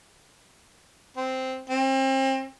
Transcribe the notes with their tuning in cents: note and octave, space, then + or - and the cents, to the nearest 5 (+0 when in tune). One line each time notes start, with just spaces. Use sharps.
C4 -5
C4 +35